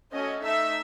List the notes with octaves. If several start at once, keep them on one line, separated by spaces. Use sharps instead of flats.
A3 C#4 F#4 D#5
A3 D#4 A4 E5